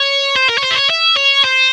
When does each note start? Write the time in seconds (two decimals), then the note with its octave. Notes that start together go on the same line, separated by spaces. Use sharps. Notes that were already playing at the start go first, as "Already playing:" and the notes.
Already playing: C#5
0.36 C5
0.49 A#4
0.58 C#5
0.63 C5
0.71 E5
0.76 C#5
0.90 E5
1.17 C#5
1.44 C5